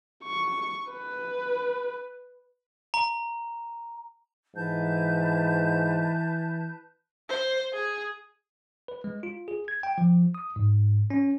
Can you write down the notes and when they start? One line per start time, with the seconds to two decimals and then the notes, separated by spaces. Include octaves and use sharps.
0.24 C#6
0.91 B4
2.94 A#5
4.56 G#2 E3 B4 A5 G6
7.29 C5
7.73 G#4
8.88 B4
9.04 G#3
9.23 F4
9.48 G#4
9.68 G#6
9.83 G5
9.98 F3
10.35 D#6
10.56 G#2
11.10 C#4